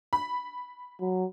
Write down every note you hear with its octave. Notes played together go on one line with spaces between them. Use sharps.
B5
F#3